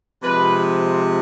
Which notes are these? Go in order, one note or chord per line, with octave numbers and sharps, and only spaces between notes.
C3 F3 G#3 B4